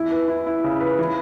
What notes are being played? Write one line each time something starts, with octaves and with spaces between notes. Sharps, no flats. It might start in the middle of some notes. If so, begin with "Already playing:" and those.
Already playing: E2 E4
B4
E4
E4
C#3
B4
E3